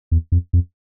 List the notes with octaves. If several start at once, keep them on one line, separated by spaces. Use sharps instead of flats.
E2
F2
F2